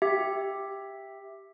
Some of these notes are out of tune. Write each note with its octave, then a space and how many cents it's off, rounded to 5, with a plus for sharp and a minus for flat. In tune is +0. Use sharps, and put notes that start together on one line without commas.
G4 +5 E5 +0